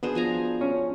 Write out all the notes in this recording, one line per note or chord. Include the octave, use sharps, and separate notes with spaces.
B3 D4 F#4 G#4 C5
F3 G#5 A#5
C#4